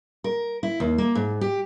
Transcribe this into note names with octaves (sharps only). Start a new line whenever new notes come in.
A#4
E4
D#2
A#3
G#2
G4